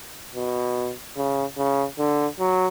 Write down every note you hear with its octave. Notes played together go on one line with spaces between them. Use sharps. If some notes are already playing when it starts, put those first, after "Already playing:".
B2
C#3
C#3
D3
F#3